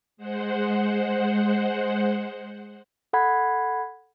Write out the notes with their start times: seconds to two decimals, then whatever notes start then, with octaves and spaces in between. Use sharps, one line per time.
0.17 G#3 C5 F#5
3.13 A4 F#5 B5 G#6